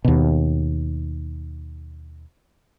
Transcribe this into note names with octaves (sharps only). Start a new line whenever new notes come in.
D#2 B2